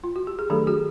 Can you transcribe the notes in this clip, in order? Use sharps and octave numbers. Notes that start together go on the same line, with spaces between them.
F4
F#4
G4
G#4
D#3 F#3 A3 D4 G4 A4
F#4 G#4